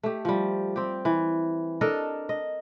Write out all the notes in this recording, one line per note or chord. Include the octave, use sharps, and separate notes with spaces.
A3 G4
F3 G3
C4 G4
E3
D4 A4 A#4 D#5
D#5